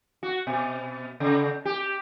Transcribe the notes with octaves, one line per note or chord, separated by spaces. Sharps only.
F#4
B2
C#3
G4